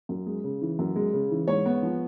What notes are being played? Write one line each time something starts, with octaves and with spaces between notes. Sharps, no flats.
F#2
G#3
C#3
E3
F#2
G#3
C#3
E3
G#2 C#5
B3
F3